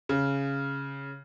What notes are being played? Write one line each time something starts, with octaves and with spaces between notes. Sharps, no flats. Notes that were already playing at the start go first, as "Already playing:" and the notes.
C#3